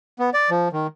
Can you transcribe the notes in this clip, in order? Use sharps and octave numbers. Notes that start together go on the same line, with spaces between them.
B3
D5
F3
D#3